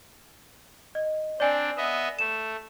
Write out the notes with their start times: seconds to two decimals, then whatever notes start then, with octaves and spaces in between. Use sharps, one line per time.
0.95 D#5
1.40 C4 D4 D5 G#5
1.77 B3 D#5 E5
2.19 A3 E7